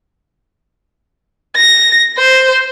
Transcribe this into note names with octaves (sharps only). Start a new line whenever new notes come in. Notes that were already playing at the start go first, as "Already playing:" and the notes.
A#6
C5